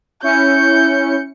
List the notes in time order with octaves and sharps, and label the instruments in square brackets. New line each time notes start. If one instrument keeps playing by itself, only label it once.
[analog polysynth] C#4 E4 C#7 [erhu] G6